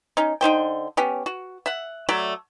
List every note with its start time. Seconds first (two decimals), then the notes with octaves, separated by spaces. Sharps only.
0.17 C#4 D#4
0.41 D3 D#4 C5 G5
0.97 B3 C#4 G4
1.26 F#4
1.66 E5 F#5
2.09 F#3 A3 D5 E5